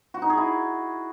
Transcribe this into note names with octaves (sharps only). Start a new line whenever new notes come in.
F#4
D#4
G#4
E4